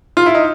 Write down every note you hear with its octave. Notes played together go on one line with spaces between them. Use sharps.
F4
E4
D#4